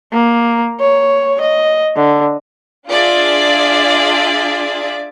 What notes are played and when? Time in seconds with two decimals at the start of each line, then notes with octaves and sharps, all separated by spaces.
0.13 A#3
0.80 C#5
1.41 D#5
1.96 D3
2.88 D4 F4 G#4 D5 E5